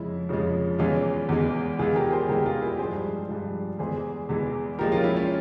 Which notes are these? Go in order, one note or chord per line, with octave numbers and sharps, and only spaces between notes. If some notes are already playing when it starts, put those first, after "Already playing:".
Already playing: F2 C#3 F3 G#3 E4
F2 C#3 F3 G#3
E2 E3 G#3 C#4 F4
E2 E3 G#3
E2 E3 G#3 F4 G#4
G4 A#4
G#4 C5
E2 E3 G#3 G4 A#4
A#4
F4 G#4
E4 G4
G2 F3 G#3 G#4 C5
G2 F3 G#3
E2 E3 G#3 G#4 C5
E2 E3 G#3
A#2 F3 G#3 G4 A#4
C#4 F4
E4
C#4